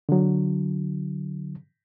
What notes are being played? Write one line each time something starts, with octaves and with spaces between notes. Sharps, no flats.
D3 F#3